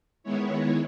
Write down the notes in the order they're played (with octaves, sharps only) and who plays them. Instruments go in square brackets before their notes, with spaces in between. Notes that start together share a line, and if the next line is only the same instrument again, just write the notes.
[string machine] D#3 G#3 B3 E4 C#5